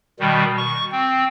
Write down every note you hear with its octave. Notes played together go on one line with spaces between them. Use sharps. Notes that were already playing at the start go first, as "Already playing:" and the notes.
B2 D#3 G3
C#6
C4